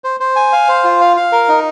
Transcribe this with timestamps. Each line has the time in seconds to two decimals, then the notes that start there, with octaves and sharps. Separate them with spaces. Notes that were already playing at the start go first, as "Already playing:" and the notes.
0.04 C5
0.20 C5
0.36 G#5
0.52 F5
0.68 C5
0.84 F4
1.01 F5
1.16 F5
1.32 A#4
1.49 D#4